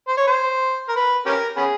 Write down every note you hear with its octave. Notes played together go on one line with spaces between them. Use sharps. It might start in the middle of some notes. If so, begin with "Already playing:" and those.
C5
C#5
C5
A#4
B4
C#4 G4 A#4
B3 C#4 G#4